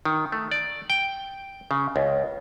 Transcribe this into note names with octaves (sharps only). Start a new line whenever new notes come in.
D#3
A3
D5
G5
C#3
C#2